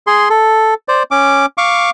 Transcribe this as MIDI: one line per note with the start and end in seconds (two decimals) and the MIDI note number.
0.07 0.29 68
0.07 0.29 84
0.30 0.74 69
0.88 1.03 72
0.88 1.03 74
1.11 1.46 61
1.11 1.46 86
1.58 1.90 77
1.58 1.90 85
1.58 1.90 86